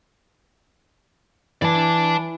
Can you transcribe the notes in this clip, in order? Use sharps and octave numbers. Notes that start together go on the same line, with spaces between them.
E3 D5 A5